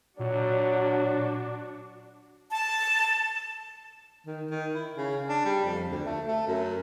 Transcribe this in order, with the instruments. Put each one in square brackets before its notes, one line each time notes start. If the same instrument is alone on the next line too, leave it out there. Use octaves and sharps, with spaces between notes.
[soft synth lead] A#2 [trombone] F#3 [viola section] D4 F#4
[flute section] A5
[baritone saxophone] D#3
D#3
E4
C#3
D4
G3
F2
D2
A3
A3
F#2